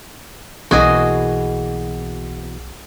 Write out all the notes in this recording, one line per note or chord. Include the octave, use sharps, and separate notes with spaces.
B1 B2 E3 A#3 F#4 G#4 D#5